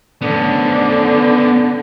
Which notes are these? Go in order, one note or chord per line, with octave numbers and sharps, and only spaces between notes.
D3 B3 C#4